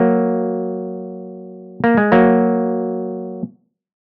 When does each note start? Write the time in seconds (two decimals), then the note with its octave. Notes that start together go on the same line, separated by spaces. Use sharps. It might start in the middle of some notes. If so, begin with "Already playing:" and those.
Already playing: F#3 A#3
1.84 A#3
1.97 G#3
2.12 F#3 A#3